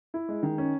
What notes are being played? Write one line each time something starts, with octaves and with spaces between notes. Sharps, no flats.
E4
G#3
D#3
C#4